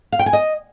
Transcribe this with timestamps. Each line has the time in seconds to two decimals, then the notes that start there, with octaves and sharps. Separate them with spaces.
0.12 F5
0.19 G5
0.26 G#5
0.33 D#5